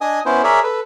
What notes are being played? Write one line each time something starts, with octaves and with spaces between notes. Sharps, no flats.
D4 D#5 G#5 D#6
B3 C#4 E4 C5
G#4 A#4 C#5 D5 E5
A4 B4